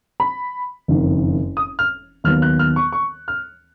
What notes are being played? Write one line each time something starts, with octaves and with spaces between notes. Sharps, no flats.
B5
F#1 F2 D#3
D#6
F6
D#2 D#3 F#3 B3 F6
F#6
F6
C#6
C#6
F6